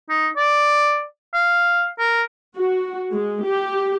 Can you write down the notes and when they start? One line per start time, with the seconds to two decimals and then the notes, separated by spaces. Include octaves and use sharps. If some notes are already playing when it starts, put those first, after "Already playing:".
0.09 D#4
0.37 D5
1.34 F5
1.99 A#4
2.56 F#4
3.12 G#3
3.45 G4